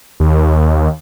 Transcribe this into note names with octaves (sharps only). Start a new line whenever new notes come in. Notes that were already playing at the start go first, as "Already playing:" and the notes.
D#2